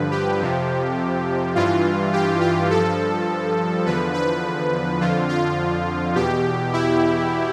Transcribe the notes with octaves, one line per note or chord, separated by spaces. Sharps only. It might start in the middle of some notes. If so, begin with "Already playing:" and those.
Already playing: G2 D3 F3 B4
G4
F2 C3 F3
G2 E3 F4
G4
F4
G2 F3 A4
E2 D3 F3 B4
B4
F2 D3 F3 F4
F4
E2 B2 G4
E4